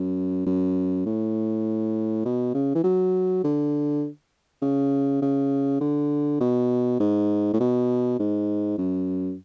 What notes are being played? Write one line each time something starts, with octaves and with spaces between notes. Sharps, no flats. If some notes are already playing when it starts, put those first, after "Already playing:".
Already playing: F#2
F#2
A2
B2
C#3
E3
F#3
D3
C#3
C#3
D3
B2
G#2
A2
B2
G#2
F#2